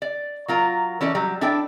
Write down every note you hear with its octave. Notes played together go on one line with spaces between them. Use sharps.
D5
F#3 F4 A#4 A#5
E3 C#4 A4 D5
F#3 G3
D4 E4 A4 D5 G5